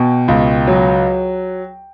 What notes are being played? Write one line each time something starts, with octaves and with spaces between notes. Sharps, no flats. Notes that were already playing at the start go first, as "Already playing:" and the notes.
Already playing: B2 G5
C#2
F#3